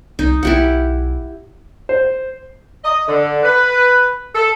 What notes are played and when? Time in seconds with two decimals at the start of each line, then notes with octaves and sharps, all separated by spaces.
0.19 C2 D#4
0.43 B1 E4 G4 F#5
1.89 C5
2.84 D#5
3.07 D3
3.43 B4
4.35 A4